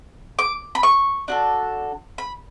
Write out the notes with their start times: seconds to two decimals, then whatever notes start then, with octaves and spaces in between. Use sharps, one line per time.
0.39 D6
0.75 B5
0.83 C#6
1.28 D4 F#4 A4
2.18 B5